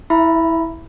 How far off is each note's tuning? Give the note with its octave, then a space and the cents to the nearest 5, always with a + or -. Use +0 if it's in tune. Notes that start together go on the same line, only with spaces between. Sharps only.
E4 -15 E5 +15 B5 +0